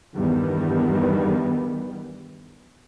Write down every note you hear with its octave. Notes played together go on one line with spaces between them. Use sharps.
E2 G2 D#3 E3 G3 B3